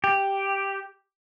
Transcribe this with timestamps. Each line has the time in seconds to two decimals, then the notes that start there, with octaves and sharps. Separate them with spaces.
0.04 G4